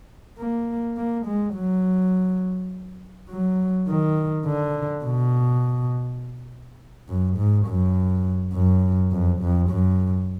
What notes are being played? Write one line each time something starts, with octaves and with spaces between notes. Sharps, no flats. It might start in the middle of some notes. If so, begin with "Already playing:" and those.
A#3
A#3
G#3
F#3
F#3
D#3
D3
B2
F#2
G#2
F#2
F#2
F2
F2
F#2